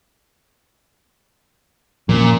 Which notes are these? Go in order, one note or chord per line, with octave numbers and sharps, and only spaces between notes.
A#2 F3 C4 C#4